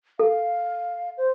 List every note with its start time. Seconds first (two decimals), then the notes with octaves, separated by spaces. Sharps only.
0.19 A4 F5
1.18 C5